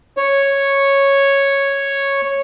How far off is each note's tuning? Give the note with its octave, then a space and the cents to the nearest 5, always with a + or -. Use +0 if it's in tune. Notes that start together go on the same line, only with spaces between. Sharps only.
C#5 -5